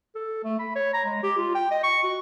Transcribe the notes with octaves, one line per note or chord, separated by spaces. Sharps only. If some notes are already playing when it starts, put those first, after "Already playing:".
A4
A3
B5
C#5
A#5
G#3
G4
F4
G5
D#5
C#6
F#4